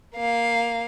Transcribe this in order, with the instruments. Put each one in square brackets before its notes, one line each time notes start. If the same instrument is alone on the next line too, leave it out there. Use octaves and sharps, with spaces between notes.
[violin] A#3 F5